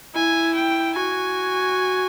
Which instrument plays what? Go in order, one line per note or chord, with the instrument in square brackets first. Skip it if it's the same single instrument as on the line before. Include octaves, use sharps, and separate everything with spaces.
[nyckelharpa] E4 [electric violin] G#5
[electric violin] G5
[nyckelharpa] F#4 [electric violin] G#5